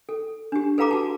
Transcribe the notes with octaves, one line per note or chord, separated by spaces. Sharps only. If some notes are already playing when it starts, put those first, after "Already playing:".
A4
D4 G4
A4 B4 F5 A#5 D6
F#4 A5